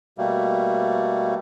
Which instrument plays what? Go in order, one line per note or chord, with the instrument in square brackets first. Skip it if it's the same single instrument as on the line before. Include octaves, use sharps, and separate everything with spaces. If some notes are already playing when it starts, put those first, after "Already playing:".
[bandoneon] B2 G3 A3 A#3